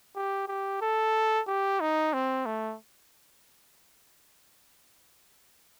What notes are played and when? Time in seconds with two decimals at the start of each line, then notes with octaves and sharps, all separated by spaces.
0.16 G4
0.48 G4
0.82 A4
1.48 G4
1.81 D#4
2.13 C4
2.46 A3